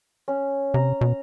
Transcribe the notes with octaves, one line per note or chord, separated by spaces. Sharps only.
C#4
C3 A#5
B2